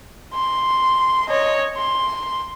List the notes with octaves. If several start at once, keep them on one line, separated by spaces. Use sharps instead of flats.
C6
C#5 D#5
C6